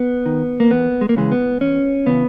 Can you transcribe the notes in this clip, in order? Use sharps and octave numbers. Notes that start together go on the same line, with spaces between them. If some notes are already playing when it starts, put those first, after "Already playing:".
Already playing: B3
D#3
A#3
E2 B3
G#3
A#3
C#3 E3 G#3
B3
E2 C#4
C#3 E3 B3